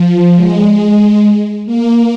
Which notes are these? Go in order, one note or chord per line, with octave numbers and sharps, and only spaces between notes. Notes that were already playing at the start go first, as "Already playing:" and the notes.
Already playing: F3
G#3
A#3